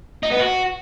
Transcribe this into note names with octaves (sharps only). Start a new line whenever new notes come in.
D#4
B3
F#4